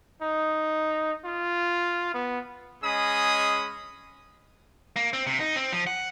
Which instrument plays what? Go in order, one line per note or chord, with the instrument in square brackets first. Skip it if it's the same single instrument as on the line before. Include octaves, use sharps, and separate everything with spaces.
[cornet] D#4
F4
B3
[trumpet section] G#3 C#4 G#4 D#5 B5 D#6
[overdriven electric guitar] A#3
C4
C3
D#4
C4
F3
F#5